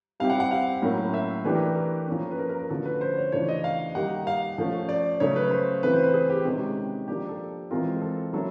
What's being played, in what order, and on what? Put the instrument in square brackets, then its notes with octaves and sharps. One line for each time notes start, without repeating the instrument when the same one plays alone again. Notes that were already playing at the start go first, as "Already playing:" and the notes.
[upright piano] G3 C4 E4 G4 [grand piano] F5
[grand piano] F#5
F#5
F5
[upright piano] A2 F#3 A#3 C#4
[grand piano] E5
[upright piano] E3 A3 D4 G4 [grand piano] B4
[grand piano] A#4
B4
A#4
[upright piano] F3 A#3 C#4
[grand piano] B4
A#4
A#4
A#4
[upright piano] D3 F3 A3 C#4 F#4 [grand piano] A4
[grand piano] B4
C5
C#5
[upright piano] C#3 E3 A3 D4 F4 [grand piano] C#5
[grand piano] D#5
F5
[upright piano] D#3 G3 A#3 D#4 G4 [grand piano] F#5
[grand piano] F5
[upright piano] F3 A3 C#4
[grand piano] D5
[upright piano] C#3 F#3 A3 [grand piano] C#5
[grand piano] B4
C5
[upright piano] E3 A3 C4 [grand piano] B4
[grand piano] C5
B4
G#4
G4
[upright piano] C3 D#3 G#3 C#4 F#4 [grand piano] G4
[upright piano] F3 A#3 D4 [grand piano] G4
[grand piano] A4
[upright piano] E3 G#3 C4 F4 [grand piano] A#4
[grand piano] A4
[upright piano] F#3 A#3 C#4 E4 [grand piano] A4